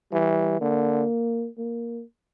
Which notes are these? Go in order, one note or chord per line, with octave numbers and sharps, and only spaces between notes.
E3 G3
D3 A#3
A#3